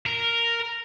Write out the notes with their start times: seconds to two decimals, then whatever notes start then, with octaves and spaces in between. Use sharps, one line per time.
0.06 A#4